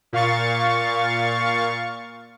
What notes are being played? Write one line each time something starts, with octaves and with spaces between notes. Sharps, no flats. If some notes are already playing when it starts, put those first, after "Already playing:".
A#2 F5 C#6 A6